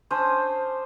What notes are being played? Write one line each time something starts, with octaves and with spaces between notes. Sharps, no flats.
C#4 D4 C5 D#6